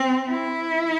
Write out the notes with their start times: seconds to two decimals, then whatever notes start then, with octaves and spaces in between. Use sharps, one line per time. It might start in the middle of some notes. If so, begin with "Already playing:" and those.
Already playing: C4
0.30 E4